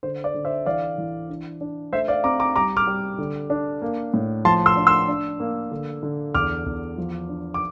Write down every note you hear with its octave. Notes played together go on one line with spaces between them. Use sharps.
D3 C5
D5
D3
C5 E5
E3 D5 F5
E3
D4
D4
A3 C5 E5
D5 F5
C4 A#5 D6
A#5 D6
G3 A#5 D6
D6 F6
G3
D3
D4
A#3
A2
F3 A5 C6
C6 E6
D4
C6 E6
D4
A#3
D3
D3
E2 D6 F6
E2
F3
D4
D6